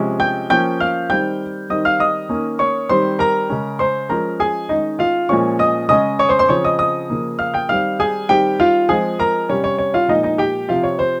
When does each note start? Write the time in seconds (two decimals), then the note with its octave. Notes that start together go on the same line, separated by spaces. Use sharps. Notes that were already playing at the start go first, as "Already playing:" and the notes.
Already playing: C3 F3 G#3 C#4
0.20 G5 G6
0.50 F3 A#3 C#4 G5 G6
0.80 F5 F6
1.10 D#3 G3 C4 G5 G6
1.70 D#3 G3 C4 D#5 D#6
1.85 F5 F6
2.00 D#5 D#6
2.29 D#3 A#3 C#4
2.59 C#5 C#6
2.89 D#3 G3 C4 C5 C6
3.19 A#4 A#5
3.50 C#3 G#3 C#4
3.79 C5 C6
4.09 F3 G#3 C#4 A#4 A#5
4.40 G#4 G#5
4.69 D#3 G#3 C#4 D#4 D#5
4.99 F4 F5
5.29 A#2 F3 G#3 C#4 C#5 C#6
5.59 D#5 D#6
5.89 C#3 G#3 C#4 D#5 D#6
6.19 C#5 C#6
6.29 C5 C6
6.39 C5 C6
6.49 C#3 F3 C4 C#5 C#6
6.64 D#5 D#6
6.79 D#5 D#6
7.10 C#3 F3 A#3
7.39 F5 F6
7.54 G5 G6
7.69 D#3 G3 C4 F5 F6
8.00 G#4 G#5
8.29 D#3 G3 C4 G4 G5
8.60 F4 F5
8.89 F3 G#3 C4 G#4 G#5
9.19 A#4 A#5
9.49 C3 G3 C#4 C#5
9.64 C#5
9.78 C#5
9.94 F4 F5
10.08 A#2 F3 G#3 D#4 D#5
10.23 D#4 D#5
10.38 G4 G5
10.69 C3 F3 C4 F4 F5
10.83 C#5
10.99 C5